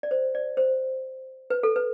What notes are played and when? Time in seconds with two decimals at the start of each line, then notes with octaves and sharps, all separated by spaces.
0.03 D5
0.11 C5
0.35 D5
0.57 C5
1.50 B4
1.63 A4
1.76 B4